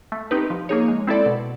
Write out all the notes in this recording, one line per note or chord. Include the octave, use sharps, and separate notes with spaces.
A3
C4 D#4 G4 B4
F3
A#3 D#4 G#4 C#5
G#3
C4 E4 A4 D5
B2